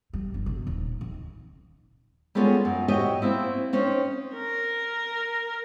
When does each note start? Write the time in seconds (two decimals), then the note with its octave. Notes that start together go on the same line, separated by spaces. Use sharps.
0.13 G3
0.34 G1
0.46 B2
0.67 D#1
1.01 D#3
2.35 G3 G#3 B3 C#4 F4 A4
2.65 F#2
2.88 F#4 G4 C#5 D#5 E5 G5
3.22 A#3 C4 E4
3.73 C4 C#4 D#4 C5
4.34 A#4